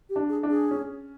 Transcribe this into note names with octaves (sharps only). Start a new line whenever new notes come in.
G4
D4
G#4
D4
G#4
C#4